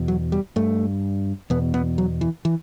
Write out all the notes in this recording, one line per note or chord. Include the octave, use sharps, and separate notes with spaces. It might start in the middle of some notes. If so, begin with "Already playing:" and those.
Already playing: E2 B2
F#3
G3
G2 A3
E2 B2 B3
B3
F#3
E3
E3